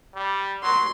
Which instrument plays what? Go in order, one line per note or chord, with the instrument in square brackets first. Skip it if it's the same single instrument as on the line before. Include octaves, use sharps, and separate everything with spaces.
[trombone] G3
[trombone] F#3 [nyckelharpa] C6